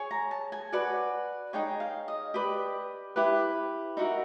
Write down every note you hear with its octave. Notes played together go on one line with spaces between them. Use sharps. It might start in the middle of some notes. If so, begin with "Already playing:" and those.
Already playing: G#4 C#5
A#5
A5
G#5
F#4 B4 D5
D#4 G#4 C#5 G5
F5
D#5
G4 B4 D5
E4 G4 B4
D#4 F#4 A#4 E5